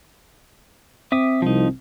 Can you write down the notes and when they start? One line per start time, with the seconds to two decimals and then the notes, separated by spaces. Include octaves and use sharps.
1.12 C4 E5 D6 D#6
1.42 C2 F3 D#4